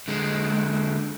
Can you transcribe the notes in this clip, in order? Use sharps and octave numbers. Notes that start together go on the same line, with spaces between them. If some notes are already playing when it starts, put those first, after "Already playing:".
D3 G#3